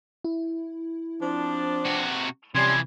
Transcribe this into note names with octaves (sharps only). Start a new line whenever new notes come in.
E4
F3 C4 D4
C3 F#4
C3 E3 F3 G3 C#4 C6 G#6